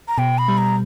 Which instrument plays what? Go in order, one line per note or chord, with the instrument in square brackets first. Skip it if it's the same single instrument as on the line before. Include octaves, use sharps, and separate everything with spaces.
[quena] A#5
[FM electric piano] B2 [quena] G5
[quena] B5
[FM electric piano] G3
[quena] A#5